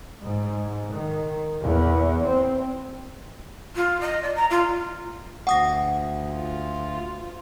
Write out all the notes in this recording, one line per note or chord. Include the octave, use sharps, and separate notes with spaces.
G#2
D#3
E2
C4
F4
D#5
D5
A#5
F4
D2 F#5 G5 D#6 A#6
F4